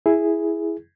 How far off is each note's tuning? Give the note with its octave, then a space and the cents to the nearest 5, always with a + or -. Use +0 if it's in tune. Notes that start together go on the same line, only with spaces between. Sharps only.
E4 +0 G#4 +0